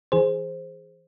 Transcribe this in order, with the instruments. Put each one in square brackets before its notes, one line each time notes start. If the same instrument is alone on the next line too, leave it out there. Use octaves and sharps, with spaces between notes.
[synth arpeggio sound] E3 G#4 C5